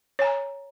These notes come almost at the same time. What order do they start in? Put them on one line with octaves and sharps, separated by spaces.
C#5 G#5 A#5